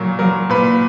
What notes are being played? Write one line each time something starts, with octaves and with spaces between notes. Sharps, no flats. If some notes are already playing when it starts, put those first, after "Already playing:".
Already playing: A#2 F#3 A#4
F#3 A#4
A#2 B4